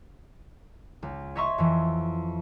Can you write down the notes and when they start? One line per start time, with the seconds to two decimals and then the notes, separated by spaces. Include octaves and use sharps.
1.03 C#2
1.36 C#5 D#5 E5 A#5 C6 C#6
1.58 F2 E3